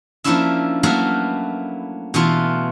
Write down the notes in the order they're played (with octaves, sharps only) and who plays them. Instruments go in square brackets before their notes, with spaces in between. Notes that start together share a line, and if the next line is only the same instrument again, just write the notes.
[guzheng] F3 A#3 C#4 D4 E4 E5
F#3 A3 A#3 E4 A#4 B4
B2 E3 A3 F4